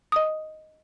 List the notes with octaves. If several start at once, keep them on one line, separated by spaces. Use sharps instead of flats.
D#5 D#6